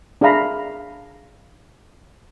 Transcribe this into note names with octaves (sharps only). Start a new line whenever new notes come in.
D4 G#4 E5 F5 A#5 B5